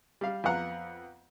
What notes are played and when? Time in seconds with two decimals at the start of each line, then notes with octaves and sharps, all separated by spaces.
0.21 G3 F5
0.44 F2 B3 F5 F#5 A#5